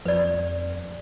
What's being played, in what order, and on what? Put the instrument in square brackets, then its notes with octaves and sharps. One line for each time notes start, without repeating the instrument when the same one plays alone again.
[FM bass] F2 [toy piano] B4 D5